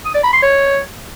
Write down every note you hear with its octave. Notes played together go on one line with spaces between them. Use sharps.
D#6
D5
B5
C6
C#5